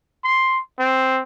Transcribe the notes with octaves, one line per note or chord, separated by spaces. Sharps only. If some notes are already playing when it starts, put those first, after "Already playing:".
C6
C4